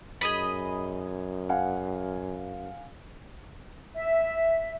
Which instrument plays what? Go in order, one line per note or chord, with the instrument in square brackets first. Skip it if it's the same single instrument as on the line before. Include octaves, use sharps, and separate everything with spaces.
[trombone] F#2 [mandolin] G#4 D#5 B5
[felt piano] F5 F#5 G#5
[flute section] E5